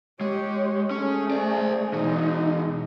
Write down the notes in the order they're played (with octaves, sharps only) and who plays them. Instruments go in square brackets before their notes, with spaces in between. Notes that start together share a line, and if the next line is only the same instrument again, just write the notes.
[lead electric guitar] G#3 [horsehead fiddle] G4 C#5
[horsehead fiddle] A3 G#4 [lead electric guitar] C#4
[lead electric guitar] C5 D5
[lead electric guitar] B2 E3 [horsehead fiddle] D#4